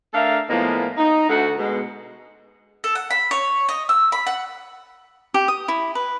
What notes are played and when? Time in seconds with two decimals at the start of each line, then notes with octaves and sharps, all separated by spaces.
0.14 A3 D4 A4 A#4 E5 F5
0.50 A2 F3 G#3 A#3 B3
0.98 D#4
1.29 D2 F#4 A4
1.58 B2 G#3
2.84 A4
2.95 F#5
3.11 B5
3.31 C#5
3.69 D#5
3.89 E6
4.12 B5
4.27 F#5
5.34 G4
5.48 D#6
5.68 E4
5.95 B4